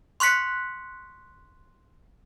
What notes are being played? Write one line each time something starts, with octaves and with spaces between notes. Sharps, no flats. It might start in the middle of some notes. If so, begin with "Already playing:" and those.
C6 C#6 F#6 B6 C#7